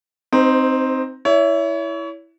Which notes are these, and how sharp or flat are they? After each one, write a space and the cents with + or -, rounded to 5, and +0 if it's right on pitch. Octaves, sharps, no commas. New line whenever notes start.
C4 +0 D#4 +0 C5 -40
E4 +0 C#5 +30